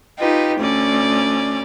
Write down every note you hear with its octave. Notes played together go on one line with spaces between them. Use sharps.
D#4 F4 G4 B4
D2 C#4 D5